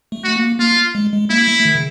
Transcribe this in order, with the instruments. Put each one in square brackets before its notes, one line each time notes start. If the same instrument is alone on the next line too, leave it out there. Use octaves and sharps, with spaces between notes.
[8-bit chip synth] A3
[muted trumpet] F#4
[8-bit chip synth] A#3
[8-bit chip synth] A#3 [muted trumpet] F4
[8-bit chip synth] G#3
G#3
[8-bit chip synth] A#3 [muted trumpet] E4
[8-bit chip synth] A3
D#3
C#3